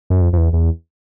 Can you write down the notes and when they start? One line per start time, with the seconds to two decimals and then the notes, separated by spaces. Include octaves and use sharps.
0.10 F#2
0.21 F2
0.33 F2
0.38 E2
0.53 E2